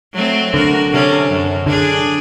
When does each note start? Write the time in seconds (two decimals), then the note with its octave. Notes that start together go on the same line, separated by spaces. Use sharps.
0.13 F#3 A3 C4
0.54 D3 F#4 A#4
0.92 C3 C#4 A4
1.29 F#2
1.66 D3 D4 G#4